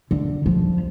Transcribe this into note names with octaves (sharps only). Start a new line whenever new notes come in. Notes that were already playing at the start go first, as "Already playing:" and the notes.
D3
F3